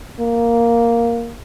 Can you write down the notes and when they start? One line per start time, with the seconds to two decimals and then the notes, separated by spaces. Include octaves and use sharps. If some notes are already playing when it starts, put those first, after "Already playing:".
0.20 A#3